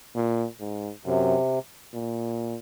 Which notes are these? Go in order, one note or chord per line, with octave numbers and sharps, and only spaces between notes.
A#2
G#2
F#2 C3
A#2